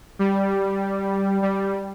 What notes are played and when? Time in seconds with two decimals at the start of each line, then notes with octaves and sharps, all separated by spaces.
0.19 G3
1.42 G3